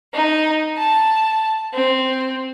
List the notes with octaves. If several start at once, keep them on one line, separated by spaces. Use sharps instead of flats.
D#4
A5
C4